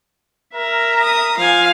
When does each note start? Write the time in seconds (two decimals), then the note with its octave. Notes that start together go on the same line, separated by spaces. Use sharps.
0.55 A#4 E5 A#5
1.01 D#6
1.37 F3 F5 G#5